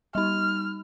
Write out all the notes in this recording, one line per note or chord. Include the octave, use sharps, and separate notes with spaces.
G3 D#4 F6